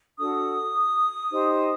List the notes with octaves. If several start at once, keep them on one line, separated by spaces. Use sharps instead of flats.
D4 F#4 A4 D#6
D#4 G4 C5